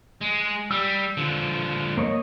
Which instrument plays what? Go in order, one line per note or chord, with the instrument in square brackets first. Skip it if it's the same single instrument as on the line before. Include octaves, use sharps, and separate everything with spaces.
[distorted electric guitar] G#3
[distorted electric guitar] G3 [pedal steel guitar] E6
[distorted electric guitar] D3 F3
[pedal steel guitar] A#3 C#5 D#5